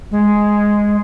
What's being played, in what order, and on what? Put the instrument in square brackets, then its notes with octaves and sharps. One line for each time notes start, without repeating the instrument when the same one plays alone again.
[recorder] G#3